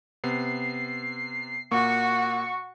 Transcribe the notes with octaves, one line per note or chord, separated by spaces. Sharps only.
C3 B3 C7
A#2 A#3 F#4 C#6